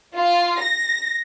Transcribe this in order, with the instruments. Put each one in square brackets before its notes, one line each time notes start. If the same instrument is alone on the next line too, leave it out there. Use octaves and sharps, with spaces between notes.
[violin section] F4
A#6